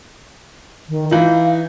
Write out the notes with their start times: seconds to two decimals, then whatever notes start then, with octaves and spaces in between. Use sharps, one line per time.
0.89 D#3
1.11 E3 D#4 F5